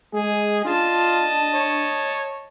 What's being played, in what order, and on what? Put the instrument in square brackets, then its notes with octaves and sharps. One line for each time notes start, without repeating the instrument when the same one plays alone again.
[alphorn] G#3 [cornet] G#4
[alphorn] D4 [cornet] F4 [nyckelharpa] D#5 A5
[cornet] C#5